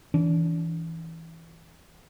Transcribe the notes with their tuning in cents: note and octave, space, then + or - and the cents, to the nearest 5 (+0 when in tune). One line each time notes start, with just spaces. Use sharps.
E3 -5 D4 -35